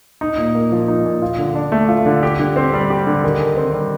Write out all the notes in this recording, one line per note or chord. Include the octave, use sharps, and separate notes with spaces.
D#4
A#2
A#3
F3
D#4
A#2
F4
D3
D4
A3
F4
D3
G4
D3
C4
G3
G4
D3
D#3
D#3
C4
G3